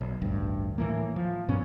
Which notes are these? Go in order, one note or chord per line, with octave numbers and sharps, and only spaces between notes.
B1
A1 D2 G2
A2 E3 A#3
F3
G2 A#2 B3 C#4